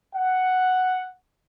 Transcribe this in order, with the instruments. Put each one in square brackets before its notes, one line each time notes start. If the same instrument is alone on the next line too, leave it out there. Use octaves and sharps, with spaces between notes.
[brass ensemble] F#5